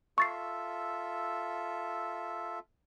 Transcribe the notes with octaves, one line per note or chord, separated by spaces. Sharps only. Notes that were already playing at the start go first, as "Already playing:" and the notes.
F4 A4 E5 C#6 A6 C7